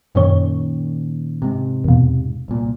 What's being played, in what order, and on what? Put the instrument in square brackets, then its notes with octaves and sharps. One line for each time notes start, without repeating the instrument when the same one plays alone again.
[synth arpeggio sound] F#2 C#5 [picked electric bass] A#2 D#3 C#4
[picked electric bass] G#2 C3
[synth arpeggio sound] E2 B2
[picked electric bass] C2 A#2